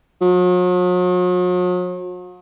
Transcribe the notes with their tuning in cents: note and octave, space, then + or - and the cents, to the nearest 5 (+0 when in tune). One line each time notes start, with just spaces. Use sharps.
F#3 -45